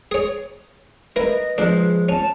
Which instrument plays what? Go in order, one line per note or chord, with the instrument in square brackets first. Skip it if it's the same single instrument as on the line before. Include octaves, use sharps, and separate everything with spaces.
[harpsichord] G#4 C#5
[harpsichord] E4 A#4 [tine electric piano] B4 [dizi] D#5
[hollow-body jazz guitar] F3 G#3 [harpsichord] D4
[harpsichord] C#4 [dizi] A5